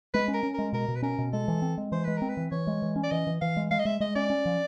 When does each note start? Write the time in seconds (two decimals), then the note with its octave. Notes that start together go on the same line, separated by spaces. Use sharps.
0.14 G#3 B4
0.28 C#4
0.34 A#4
0.43 C#4
0.54 G#3 A#4
0.73 B2 A#4
0.88 B2
0.96 B4
1.02 C#4 A#4
1.19 B2
1.33 G#3 A4
1.48 E3
1.62 C4
1.78 G#3
1.92 E3 C5
2.04 G#3 B4
2.17 C4 A#4
2.29 B4
2.37 E3
2.51 E3 C#5
2.67 G#3
2.82 E3
2.96 C#4
3.03 D5
3.12 E3 D#5
3.27 E3
3.41 E3 F5
3.57 G#3
3.71 G#3 F5
3.79 D#5
3.85 G#3 E5
4.00 G#3 D#5
4.15 C#4 D5
4.30 C#4
4.46 F3